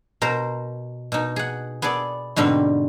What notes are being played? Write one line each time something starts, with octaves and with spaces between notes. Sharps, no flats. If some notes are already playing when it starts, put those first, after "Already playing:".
B2 A#4 C5
B2 D#4
G#4 F#5
B3 G#4 A4 D5
G#2 B2 D3 G3 C4